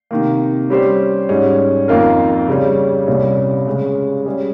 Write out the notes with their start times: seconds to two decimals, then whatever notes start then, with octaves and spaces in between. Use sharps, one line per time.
0.11 C3 D#3 A#3
0.70 G3 C#4 G4 C5
1.29 G#2 G3 C#4
1.88 F2 D#3 A#3 F4 A#4
2.48 C#3 G3 C#4
3.07 C2 A#2 G3 C#4
3.67 C#3 G#3 C#4
4.26 G3 C#4 G#4 C#5